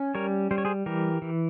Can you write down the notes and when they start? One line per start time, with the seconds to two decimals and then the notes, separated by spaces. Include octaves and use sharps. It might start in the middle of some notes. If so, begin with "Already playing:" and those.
Already playing: C#4
0.15 G3 A#4 C#5
0.51 G3 C5
0.58 C#5
0.65 G#4 C5
0.86 E3 G4 A#4
1.22 E3